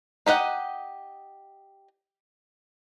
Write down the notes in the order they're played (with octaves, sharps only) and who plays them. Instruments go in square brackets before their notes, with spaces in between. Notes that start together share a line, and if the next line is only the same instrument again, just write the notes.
[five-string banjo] D#4 G4 D#5 F#5